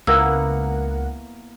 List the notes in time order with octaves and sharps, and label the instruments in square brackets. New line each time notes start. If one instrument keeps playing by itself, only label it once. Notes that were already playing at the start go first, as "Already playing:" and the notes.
[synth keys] C#2 A#4 F#5 [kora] A#3 B3 E4 [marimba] E6